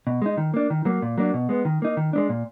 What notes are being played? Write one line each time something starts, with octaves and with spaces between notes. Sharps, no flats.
B2
G#3 D#4
D#3
A#3 D4
D#3
F#3 A#3
A#2
F#3 A#3 D4
B2
G#3 B3
D#3
A#3 D#4
D#3
G#3 B3 D4
A#2